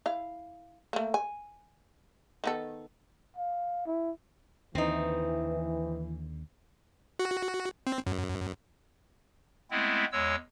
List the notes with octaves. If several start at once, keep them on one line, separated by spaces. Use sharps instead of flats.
E4 F5
A3 A#3
G#5
D#3 B3 A4
F5
E4
D#2 D3 E3 C4 D#4
F#4
C4
F#2
G#3 A3 B3 C4 E4
E2 G#3 C#5 E6